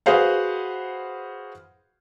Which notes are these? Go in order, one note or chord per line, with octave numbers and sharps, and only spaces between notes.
F#4 G#4 B4 C5 F5 F#5